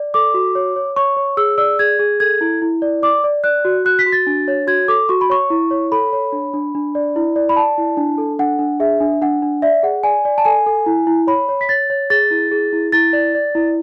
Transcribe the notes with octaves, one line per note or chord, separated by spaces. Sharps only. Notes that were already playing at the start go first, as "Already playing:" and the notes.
Already playing: D5
A4 D6
F#4
C#5
C#5
C#5 C#6
C#5
G#4 E6
D5 E6
G#4 G#6
G#4
A4 G#6
E4
E4
D5
D5 D6
D5
D5 F#6
F#4
F#4 F#6
B6
F#4
A6
D4
C#5
F#4 G#6
A4 D6
F#4 C#6
B5
C#5 C#6
E4
C#5
A4 B5
C#5
D4
D4
D4
D5
E4
D5
B5
D5 A5
E4
D4
A4
D4 F#5
D4
G#4 E5
D4
D4 F#5
D4
D5 E5
G#4 F#5
D5 G#5
D5
A5
A4 G#5
A4
E4
E4
C#5 B5
C#5
B6
C#5 A6
C#5
G#4 A6
E4
G#4
E4
E4 A6
D5
D5
E4